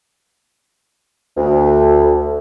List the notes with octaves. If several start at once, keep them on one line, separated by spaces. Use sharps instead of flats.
D2